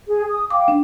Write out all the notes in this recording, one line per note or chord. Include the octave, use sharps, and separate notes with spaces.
G#4
D#6
F5 G5 D6
D4